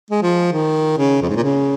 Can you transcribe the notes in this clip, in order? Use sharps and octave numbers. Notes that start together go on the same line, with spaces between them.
G#3
F3
D#3
C#3
F2
G#2
A#2
C#3